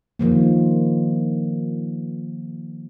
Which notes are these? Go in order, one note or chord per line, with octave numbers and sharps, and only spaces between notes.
D#3 F3 A#3